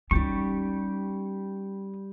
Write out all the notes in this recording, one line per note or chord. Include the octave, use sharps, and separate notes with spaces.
G3 C#4 D#4 G4 C#6